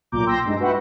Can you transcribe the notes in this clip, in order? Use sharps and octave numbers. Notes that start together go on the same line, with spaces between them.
B1 A#2 A#5 D6 G6
G5 C6 E6 G6 A#6
G2 G#3 D#4
F#4 B4 E5 F#5 G5